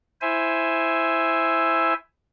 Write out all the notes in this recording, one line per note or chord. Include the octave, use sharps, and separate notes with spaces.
E4 C5 E5 G#5